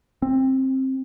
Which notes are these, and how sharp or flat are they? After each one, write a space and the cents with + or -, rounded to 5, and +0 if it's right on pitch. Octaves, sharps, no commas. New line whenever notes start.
C4 +15